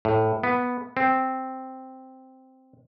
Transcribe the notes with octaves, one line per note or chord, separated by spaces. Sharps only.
A2
B3
C4